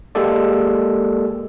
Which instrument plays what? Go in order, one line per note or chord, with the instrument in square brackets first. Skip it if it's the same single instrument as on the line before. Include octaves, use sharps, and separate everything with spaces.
[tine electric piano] G#3 A#3 G4 A4 D5